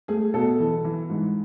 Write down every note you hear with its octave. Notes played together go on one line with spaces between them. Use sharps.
A3 G#4
B2 A4
E3
E3
G#2